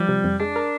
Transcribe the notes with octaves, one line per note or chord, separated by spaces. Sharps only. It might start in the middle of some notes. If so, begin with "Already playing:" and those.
Already playing: F3 G3
C3
F2
G#3 D4
A#4